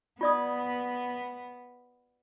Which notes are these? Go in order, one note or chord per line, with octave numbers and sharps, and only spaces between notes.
B3 F4 D5 D#6